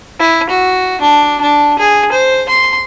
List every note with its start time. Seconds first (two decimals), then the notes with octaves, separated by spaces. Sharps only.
0.19 E4
0.50 F#4
1.01 D4
1.41 D4
1.79 G#4
2.12 C5
2.49 C6